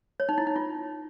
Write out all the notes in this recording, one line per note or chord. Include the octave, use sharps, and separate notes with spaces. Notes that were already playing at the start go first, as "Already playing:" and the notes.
C#5
D#4
E4
D#4
F4